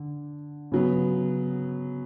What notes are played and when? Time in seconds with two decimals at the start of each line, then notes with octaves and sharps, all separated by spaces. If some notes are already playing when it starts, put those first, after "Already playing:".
Already playing: D3
0.72 C#3 F#3 B3